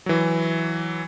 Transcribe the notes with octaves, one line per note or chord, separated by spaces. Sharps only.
E3 F#3